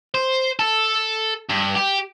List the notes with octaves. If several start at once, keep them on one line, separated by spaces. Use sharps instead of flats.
C5
A4
G2
G4